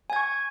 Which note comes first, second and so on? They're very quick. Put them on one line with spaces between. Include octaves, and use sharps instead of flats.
G#5 G#6 C#6